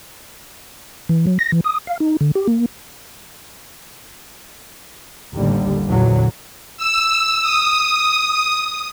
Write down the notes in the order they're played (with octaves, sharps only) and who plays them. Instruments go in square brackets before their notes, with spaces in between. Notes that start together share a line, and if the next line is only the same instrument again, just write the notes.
[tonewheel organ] E3
F#3
A#6
E3
D#6
F5
D#4
D3
G4
A#3
[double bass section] A1 D#2 D3 G3
A#1 E2 D3 F#3
[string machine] E6
D#6